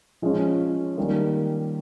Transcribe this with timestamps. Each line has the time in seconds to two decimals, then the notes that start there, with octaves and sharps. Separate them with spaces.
0.22 F3 G#3 C#4 F4
0.97 D#3 G3 A#3